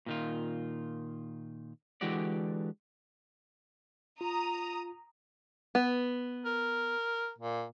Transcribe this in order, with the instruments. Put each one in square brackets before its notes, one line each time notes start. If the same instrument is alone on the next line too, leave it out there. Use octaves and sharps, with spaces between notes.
[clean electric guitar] A#2 D#3 F4
D3 E3 G#3 F#4 G4 D5
[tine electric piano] F4 [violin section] A#5 D#6
[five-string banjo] B3
[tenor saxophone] A#4
A#2